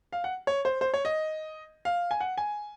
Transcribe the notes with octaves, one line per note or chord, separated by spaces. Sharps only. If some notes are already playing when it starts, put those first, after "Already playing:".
F5
F#5
C#5
C5
C5
C#5
D#5
F5
G#5
F#5
G#5